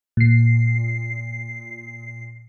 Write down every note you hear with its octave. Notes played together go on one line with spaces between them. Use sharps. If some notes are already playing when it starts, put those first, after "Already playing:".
A#2 C7